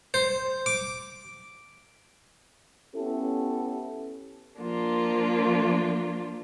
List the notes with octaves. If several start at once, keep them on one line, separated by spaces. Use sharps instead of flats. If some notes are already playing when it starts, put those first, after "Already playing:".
C5
D6
B3 C#4 E4 G4 A4
F3 A#3 D4 F4